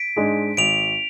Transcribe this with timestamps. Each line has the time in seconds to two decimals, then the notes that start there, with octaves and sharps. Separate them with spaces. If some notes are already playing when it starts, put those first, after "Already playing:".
Already playing: B6 D7
0.16 G#2 G#3 D4 G#4
0.57 G#1 D7 F7